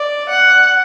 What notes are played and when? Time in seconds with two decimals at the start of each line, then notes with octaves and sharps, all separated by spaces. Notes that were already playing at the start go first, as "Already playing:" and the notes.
Already playing: D5
0.29 F#5